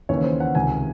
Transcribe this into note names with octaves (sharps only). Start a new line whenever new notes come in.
D#2 C#3 E3 C#5
C5
F#5
C#2 C3 D#3 G#5